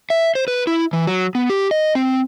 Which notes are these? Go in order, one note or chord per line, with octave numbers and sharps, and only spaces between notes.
E5
C5
B4
E4
E3
F#3
B3
G4
D#5
C4